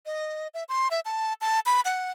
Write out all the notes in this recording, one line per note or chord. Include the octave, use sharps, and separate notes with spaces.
D#5
E5
C6
E5
A5
A5
B5
F#5